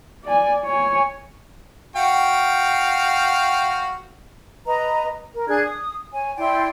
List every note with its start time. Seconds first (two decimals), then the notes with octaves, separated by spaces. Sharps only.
0.25 D5 G#5
0.65 C#5 G#5
1.96 F#4 F5 G5
4.66 B4 D#5 A#5
5.34 A#4
5.47 D4 G#4 F#6 G#6
5.64 D#6
6.12 C#5 G#5
6.37 E4 D5 G5 C6